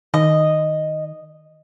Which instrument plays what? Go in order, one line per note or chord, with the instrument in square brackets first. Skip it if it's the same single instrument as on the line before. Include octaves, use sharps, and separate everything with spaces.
[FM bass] D#3 [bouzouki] D#5